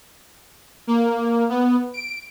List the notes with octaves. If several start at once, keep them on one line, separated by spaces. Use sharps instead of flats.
A#3
B3
D7